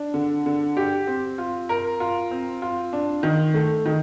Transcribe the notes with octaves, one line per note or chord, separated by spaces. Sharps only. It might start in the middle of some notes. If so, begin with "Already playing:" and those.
Already playing: D4
D3
D3
G4
C4
F4
A#4
F4
C4
F4
D4
D#3
A3
D#3